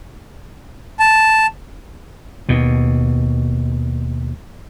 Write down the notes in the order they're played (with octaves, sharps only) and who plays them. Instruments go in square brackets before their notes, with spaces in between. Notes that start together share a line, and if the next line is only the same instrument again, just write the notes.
[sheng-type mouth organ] A5
[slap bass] D#2 B2